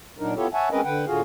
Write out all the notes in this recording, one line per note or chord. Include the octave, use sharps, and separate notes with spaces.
A#2 F#3 D4 D#4 A#4
B3 E4 F4 G4 A4 C#5
C#5 E5 F#5 G#5 A5
G#3 C4 C#4 A#4 B4 D#5
D3 B4 F#5 G5
A2 D3 F4 F#4 G#4 F5